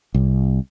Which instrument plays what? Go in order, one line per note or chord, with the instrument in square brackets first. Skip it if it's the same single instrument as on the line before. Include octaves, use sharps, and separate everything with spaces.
[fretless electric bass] C2